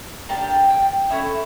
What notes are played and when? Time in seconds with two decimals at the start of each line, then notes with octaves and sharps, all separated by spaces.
0.29 A#3 D4 G4 A5
0.70 G5
1.10 A3 C#4 E4 E5